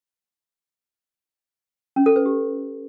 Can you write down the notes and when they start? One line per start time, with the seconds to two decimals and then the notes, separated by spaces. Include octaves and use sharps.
1.96 C#4
2.06 A4
2.16 B4
2.26 G4